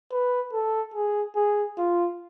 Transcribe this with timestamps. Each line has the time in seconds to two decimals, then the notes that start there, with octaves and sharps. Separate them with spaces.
0.12 B4
0.53 A4
0.94 G#4
1.36 G#4
1.78 F4